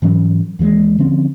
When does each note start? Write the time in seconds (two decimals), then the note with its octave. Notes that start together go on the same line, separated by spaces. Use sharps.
0.02 G#2 E3 F#3 C#4
0.59 D#2 E3 F#3 G#3
0.99 D3 F3 C4 C#4